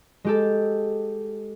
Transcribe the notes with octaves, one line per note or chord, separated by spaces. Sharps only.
G#3 G4 A4